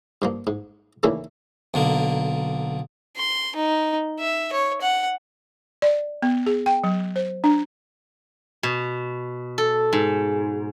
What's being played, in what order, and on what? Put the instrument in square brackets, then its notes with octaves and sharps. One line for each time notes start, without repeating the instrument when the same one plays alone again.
[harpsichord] G2 F3 A#3
G#2
D#2 A#2 C#3 E3 A3 A#3
B1 D3 A#3
[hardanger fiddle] C6
D#4
E5
C#5
F#5
[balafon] D5
B3
G#4
G5
F#3
C5
D4
[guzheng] B2
A4
G#2